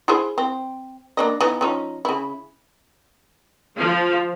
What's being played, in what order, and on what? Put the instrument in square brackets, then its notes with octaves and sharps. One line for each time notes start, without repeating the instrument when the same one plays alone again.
[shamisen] E4 G#4 C5
C4
A#3 D4 D#5
E3 B3 D#4
F3 C#4 D#4
C#3 E4
[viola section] F3